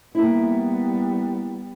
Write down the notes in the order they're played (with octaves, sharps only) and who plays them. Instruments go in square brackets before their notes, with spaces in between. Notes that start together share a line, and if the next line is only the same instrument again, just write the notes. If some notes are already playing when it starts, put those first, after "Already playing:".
[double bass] G3 B3 [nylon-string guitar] A#3 E4